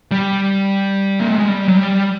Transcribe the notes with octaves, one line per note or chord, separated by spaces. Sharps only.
G3
A#3
A3
G#3
G3
F#3
G3